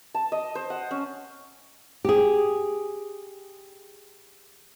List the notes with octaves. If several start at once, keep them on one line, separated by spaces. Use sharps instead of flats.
A5
D#5
C5
F#5
C#4
G4 G#4